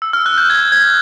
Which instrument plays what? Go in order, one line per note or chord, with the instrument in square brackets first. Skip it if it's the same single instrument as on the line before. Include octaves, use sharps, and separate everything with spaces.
[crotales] E6
F6
F#6
G6
G#6
G#6